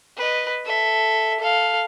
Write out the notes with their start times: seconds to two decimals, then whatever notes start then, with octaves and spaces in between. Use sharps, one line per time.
0.18 B4 D#5
0.66 A4 E5
1.40 A4 F5